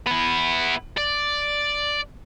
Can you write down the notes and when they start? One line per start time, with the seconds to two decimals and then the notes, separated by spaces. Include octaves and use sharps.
0.07 B3 E4
0.97 D5